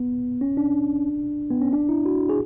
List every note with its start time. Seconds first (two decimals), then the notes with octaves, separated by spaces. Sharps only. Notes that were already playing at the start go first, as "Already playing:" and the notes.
Already playing: B3
0.41 C#4
0.57 D4
1.51 B3
1.62 C#4
1.73 D4
1.89 E4
2.06 F#4
2.29 G#4